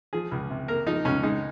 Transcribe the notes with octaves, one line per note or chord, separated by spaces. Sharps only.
F3 G#4
C#2
C3
A#3 A#4
F3 D#4
C#2 C#4
G#3 D#4